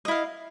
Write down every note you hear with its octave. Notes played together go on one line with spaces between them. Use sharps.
E4 D#5 F5